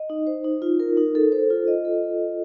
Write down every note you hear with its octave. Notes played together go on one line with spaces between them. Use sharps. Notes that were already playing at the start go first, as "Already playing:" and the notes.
Already playing: D#5
D#4
C5
D#4
F4
A#4
D#4
A4
C5
F4
D#5
A4